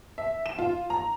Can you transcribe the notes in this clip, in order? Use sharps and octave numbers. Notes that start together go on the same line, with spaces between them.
E5
E7
F4
A#5